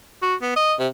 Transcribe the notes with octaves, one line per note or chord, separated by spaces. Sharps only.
F#4
B3
D#5
C3